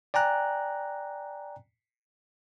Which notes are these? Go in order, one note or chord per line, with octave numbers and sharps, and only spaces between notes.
D5 G5 G#5 A#5 F#6